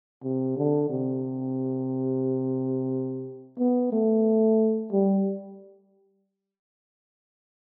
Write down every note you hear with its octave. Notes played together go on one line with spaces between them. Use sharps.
C3
D3
C3
B3
A3
G3